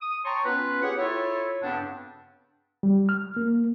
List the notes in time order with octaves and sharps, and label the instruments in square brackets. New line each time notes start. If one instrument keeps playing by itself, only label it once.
[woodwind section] D#6
C#5 G5 A5 A#5 C6 C#6
B3 C#4 F4 B4
G4 G#4 C#5 F#5
E4 F4 A4 C#5
G2 C#3 B3 C4 D4
[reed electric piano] G3
F6
A#3